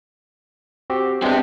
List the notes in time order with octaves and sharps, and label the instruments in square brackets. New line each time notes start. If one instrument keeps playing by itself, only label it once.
[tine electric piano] C4 F#4 G4
[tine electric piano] G#3 B3 D4 [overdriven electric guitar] C4 G4